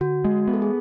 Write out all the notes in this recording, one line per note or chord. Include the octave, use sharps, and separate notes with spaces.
D3 F#4
G#3
B3
A4
G#4